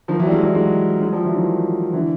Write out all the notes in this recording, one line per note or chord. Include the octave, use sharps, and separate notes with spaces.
D#3 F3
E3 F#3
G3
F#3 G#3
E3 F#3
F#3 G#3
F#3 G#3
F3 G3
E3 F#3
D#3 F3
D3 E3